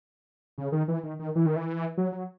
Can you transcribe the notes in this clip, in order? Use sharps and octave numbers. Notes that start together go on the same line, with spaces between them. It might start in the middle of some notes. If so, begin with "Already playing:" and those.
C#3
D#3
E3
D#3
D#3
E3
D#3
E3
F#3
F#3